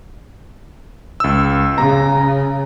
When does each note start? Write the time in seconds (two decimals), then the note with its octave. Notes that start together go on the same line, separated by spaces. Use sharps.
1.20 C#2 E6
1.78 C#3 A#5